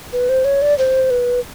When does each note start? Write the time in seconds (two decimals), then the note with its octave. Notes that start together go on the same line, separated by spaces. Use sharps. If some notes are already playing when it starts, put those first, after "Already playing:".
0.13 B4
0.29 C5
0.45 C#5
0.62 D5
0.78 C5
1.10 B4